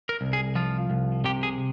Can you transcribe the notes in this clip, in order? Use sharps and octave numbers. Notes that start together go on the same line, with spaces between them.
A#4
C2
G#4
F3 F4
C2
C3 G4
G#4